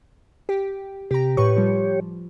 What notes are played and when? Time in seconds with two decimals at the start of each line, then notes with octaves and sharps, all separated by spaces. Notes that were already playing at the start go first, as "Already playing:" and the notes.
0.49 G4
1.11 C3 G4 A#5
1.37 A2 G4 B4 C#5 C#6
1.56 F3 G3